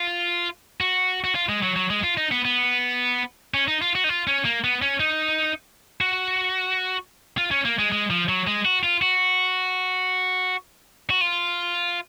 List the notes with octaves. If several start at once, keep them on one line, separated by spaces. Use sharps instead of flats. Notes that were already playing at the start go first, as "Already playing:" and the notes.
Already playing: F4
F#4
F#4
F4
G#3
F#3
F#3
G#3
F4
D#4
B3
B3
C#4
D#4
F4
F#4
D#4
F4
C#4
A#3
B3
C#4
D#4
F#4
F4
C#4
A#3
G#3
G#3
F3
F#3
G#3
F#4
F4
F#4
F#4
F4